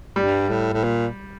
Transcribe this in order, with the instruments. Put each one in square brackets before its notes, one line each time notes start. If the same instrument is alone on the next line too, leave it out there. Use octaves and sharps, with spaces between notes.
[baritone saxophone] G2 [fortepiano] G3
[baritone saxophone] A2
A2
A#2